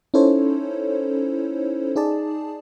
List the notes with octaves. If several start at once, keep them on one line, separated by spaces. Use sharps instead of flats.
C#4 D#4 E4 A4 C5 C#5
D#4 G#4 D5 A5